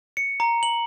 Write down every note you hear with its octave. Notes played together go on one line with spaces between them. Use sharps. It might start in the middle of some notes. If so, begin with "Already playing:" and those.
C#7
A#5
F#7